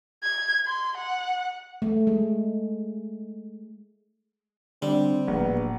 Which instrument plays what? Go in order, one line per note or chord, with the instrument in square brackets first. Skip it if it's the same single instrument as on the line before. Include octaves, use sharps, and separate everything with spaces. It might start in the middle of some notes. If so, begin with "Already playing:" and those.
[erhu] G#6
C6
F#5
[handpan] A3
G#3
[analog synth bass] D3 [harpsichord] G3 [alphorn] C4
[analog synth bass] D1 [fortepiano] A#1 [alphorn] B3